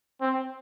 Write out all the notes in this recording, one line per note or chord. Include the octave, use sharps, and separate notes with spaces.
C4